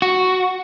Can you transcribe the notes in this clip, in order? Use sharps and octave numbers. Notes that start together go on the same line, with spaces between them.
F#4